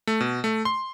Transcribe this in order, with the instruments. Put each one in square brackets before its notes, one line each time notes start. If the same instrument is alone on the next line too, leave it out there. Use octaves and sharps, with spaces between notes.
[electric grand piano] A3
B2
A3
C6